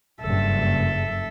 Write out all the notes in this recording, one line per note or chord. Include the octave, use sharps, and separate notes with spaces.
F#1 G2 A4 E5